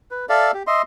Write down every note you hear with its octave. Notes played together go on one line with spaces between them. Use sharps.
B4
A4 D5 E5 F5
G4
D#5 E5 C6